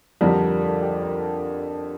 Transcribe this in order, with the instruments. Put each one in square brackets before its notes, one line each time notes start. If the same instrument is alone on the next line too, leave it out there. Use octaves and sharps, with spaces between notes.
[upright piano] F2 D3 G3 D4 [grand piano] A#4
[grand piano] A#4
A4
G4
A#4